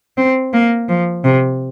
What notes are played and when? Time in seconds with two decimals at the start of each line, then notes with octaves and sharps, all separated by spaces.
0.17 C4
0.53 A#3
0.89 F3
1.24 C3